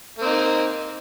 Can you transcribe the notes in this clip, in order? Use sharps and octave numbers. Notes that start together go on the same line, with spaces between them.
A#3 C4 D#4